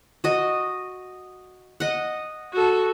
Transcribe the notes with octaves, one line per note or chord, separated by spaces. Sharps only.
F#4 D#5
D#5 F#5
F#4 A4